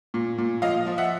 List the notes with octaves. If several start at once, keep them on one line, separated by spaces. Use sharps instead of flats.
A#2
A#2
F3 D#5 F5
F3
E5 F#5